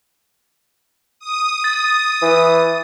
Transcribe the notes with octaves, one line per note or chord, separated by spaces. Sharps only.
D#6
A6
E3